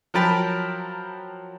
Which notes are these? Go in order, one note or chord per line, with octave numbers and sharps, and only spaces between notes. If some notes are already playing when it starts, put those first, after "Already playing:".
F3 F#3 A#4 G5 A5 B5